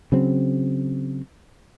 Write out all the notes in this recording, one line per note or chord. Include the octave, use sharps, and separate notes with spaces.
C#3 F#3 C4